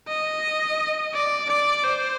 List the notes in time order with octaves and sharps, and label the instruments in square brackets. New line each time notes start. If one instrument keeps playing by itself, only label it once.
[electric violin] D#5
D5
D5
C5